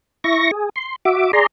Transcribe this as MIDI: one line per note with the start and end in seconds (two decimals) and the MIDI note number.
0.24 0.51 64
0.24 0.51 85
0.24 0.51 94
0.51 0.69 68
0.76 0.96 84
1.05 1.31 66
1.05 1.31 76
1.05 1.31 86
1.33 1.46 68
1.33 1.46 74
1.33 1.46 82
1.33 1.46 84